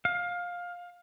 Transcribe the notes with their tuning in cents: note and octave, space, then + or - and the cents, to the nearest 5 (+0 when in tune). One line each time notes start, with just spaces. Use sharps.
F5 +15